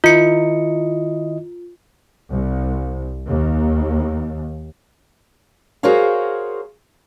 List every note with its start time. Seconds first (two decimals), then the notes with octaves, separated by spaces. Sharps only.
0.04 D#3 E4 F4 D#5 C#7
2.30 C2
3.27 D#2
5.83 F#4 G#4 A#4 C5 C#5 F5